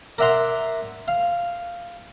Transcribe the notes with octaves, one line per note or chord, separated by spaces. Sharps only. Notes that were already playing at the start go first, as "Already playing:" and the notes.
A#4 D5 E5 F#5 A#5 C6
F5